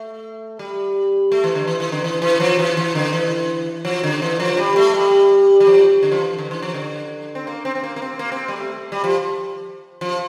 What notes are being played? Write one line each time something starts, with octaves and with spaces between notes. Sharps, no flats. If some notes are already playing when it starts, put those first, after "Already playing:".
Already playing: A3
G3
A3
E3
D3
E3
E3
D3
E3
E3
F3
E3
E3
D3
E3
F3
D3
E3
F3
G3
A3
G3
G3
F3
D3
F3
E3
D3
E3
F3
D3
C4
A#3
C4
C4
A#3
A#3
C4
A#3
C4
G3
A3
G3
F3
F3